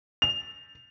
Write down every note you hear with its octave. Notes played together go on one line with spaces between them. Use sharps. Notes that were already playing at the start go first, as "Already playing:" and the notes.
F7